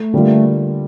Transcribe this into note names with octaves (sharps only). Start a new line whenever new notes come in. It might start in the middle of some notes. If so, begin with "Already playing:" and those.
Already playing: A3
D3 G3 A#3 F4